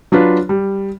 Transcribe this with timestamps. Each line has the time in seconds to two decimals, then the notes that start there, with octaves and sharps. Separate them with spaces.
0.12 F#3 D4 F4 B4
0.49 G3